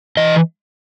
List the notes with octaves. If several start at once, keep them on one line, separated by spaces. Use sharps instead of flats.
E3 D#5